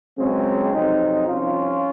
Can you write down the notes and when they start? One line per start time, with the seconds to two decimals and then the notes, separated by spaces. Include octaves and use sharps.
0.18 C#2 C#3 F#3 G#3 C4
0.74 F2 C3 F#3 C4 D#4
1.28 C2 C3 F3 C#4 F4